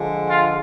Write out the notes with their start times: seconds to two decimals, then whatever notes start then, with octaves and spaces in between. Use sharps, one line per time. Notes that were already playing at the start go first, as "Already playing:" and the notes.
Already playing: D3 F3 G#3
0.29 F4